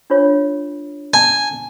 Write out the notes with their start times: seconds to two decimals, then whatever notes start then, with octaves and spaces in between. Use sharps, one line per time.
0.10 D4 F4 C#5
1.14 G#5 A5